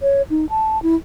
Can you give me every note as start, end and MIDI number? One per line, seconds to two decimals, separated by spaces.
0.01 0.22 73
0.30 0.46 63
0.50 0.81 81
0.83 0.95 64